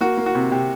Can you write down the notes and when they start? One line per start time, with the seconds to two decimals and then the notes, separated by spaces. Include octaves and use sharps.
0.01 A#3 F#4
0.17 A#3
0.26 F#4
0.35 C3
0.51 C3 G4